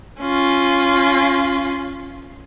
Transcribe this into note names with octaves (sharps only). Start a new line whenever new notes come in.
C#4 F4